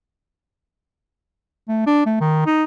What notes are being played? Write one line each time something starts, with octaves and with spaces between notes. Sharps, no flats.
A3
D4
A3
D#3
D#4